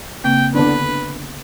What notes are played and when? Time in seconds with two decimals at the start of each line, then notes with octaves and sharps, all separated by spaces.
0.24 C#3 A#3 C4 G5
0.55 D3 B3 D4 B4